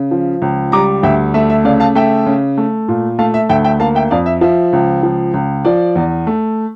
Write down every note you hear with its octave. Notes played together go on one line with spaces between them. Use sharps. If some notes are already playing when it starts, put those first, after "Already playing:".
Already playing: C#3
F3
C#2
G3 A#5 D6
D2 E5 G5
A3 E5
E5
C#3 D5 F5
F5 A5
A3 E5 G5
C#3
A3
A#2
A3 F5 A5
E5
D2 E5 G5
E5 G5
A#3 F5 A5
E5 G5
F2 D5 F5
E5
F3 E5
C#2
F3
C#2
F3 D5
E2
A3